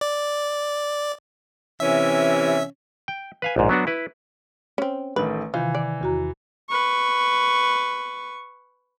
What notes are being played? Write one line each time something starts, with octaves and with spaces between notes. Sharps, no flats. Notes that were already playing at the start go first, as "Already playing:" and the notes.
D5
C3 E3 C#4 E5
G5
B4 F5 G#5
A#1 G#2
F#3 B3 D4 F#4
E4 B4
C4 C#4
A1 D#3 A3 B4
C3 D#3 E3 F4 F5
D5
E2 F#4 A#5
B4 C#6